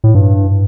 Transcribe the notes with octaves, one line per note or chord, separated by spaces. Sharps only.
A2
G2